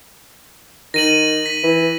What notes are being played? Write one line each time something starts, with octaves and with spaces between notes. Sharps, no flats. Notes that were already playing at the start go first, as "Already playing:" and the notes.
D#3 A#6 D#7 F#7
B6
E3